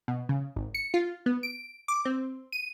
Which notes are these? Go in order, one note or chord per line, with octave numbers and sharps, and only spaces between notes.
B2
C#3
G#1
C#7
F4
B3
D7
D6
C4
D#7